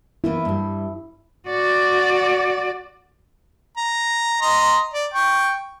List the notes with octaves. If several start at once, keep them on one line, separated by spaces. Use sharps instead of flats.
E3 A#3 B3 E4
G2 G3
F#4 D5
A#5
D#5 A#5 C6
D5
G5 C#6